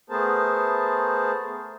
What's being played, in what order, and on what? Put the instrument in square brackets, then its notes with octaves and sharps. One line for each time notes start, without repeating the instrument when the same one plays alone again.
[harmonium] A3 B3 G#4 A#4 C5 A5